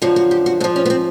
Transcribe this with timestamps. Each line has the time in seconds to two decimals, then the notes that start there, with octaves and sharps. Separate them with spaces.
0.02 F#2 D3 F3 F#4
0.16 F#4
0.31 G4
0.46 F#4
0.60 G#2 D4
0.64 F3
0.76 C#4
0.85 B3
0.90 C4